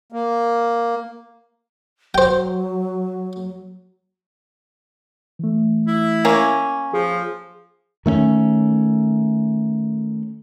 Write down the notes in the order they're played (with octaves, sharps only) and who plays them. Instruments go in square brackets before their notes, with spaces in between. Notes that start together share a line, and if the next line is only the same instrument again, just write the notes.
[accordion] A#3
[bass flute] F#3 [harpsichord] C5 G5
[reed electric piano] E3 A3
[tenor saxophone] E4
[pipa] A#3 C#4
[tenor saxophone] F3 [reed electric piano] G#4
[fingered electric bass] D#3 A3 C4 C#4